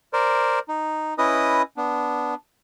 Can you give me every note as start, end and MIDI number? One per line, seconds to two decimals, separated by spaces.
0.13 0.59 70
0.13 0.59 72
0.13 0.59 74
0.68 1.14 63
1.18 1.62 61
1.18 1.62 64
1.18 1.62 71
1.18 1.62 75
1.18 1.62 87
1.77 2.34 59
1.77 2.34 62